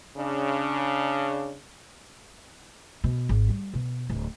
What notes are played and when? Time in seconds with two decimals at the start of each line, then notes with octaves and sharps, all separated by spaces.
0.17 C#3 D4
3.04 B2
3.29 G#1
3.49 G3
3.74 B2
4.10 D1